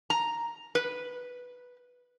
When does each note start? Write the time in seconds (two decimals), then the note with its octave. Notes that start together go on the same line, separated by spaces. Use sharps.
0.10 A#5
0.75 B4